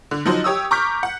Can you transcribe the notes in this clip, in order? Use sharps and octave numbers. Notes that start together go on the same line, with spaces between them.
D3
F3 F#3 D#4 F#4 C5 D#5
G4 C#5 D#6 E6
A#5 C#6 D6 F6 G6 B6
F#5